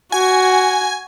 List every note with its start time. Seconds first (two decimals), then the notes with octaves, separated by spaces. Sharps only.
0.12 F#4 G#5